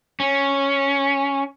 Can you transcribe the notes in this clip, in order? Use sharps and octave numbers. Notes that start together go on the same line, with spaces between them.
C#4